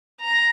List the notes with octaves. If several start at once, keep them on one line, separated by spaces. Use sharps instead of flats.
A#5